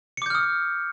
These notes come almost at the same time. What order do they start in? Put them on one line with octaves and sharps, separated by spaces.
C#7 D6 G6 F6 D#6